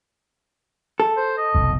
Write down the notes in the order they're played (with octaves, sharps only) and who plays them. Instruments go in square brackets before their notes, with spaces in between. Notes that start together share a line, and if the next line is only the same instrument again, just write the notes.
[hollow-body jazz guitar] A4
[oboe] C5
D#5
[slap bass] F1 B1 F2